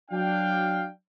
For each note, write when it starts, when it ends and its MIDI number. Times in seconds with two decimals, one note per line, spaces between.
0.11 0.86 54
0.11 0.86 62
0.11 0.86 77
0.11 0.86 79